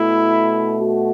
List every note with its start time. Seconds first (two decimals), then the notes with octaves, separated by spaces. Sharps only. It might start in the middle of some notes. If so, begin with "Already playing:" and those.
Already playing: B2 A3 E4
0.79 F#4